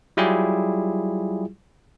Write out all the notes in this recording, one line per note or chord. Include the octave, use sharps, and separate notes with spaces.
F#3 G3 E4 F4 G4 G#4